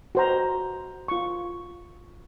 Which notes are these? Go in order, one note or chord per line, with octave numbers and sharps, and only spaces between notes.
F#4 C5 A#5
F4 C#6